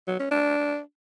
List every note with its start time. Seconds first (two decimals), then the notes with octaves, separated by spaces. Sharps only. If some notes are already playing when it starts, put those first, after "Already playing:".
0.07 F#3
0.19 C#4
0.31 D4